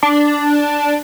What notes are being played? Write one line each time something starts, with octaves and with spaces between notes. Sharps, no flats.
D4